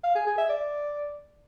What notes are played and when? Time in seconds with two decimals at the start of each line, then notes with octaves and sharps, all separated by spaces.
0.04 F5
0.15 G#4
0.27 G#4
0.38 E5
0.50 D5